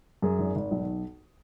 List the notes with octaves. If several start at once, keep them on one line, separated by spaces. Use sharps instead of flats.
F#2 G#4
G#1
G#1
B1